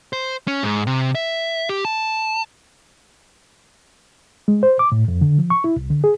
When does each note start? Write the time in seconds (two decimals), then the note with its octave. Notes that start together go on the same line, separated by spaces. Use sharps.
0.13 C5
0.48 C#4
0.63 G#2
0.87 C3
1.15 E5
1.69 G4
1.85 A5
4.48 G#3
4.63 C5
4.79 D6
4.92 A2
5.08 F2
5.21 D3
5.38 F3
5.50 C#6
5.64 E4
5.76 C2
5.90 D3
6.04 G#4